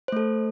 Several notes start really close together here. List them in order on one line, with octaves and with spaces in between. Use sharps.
C5 A3 A4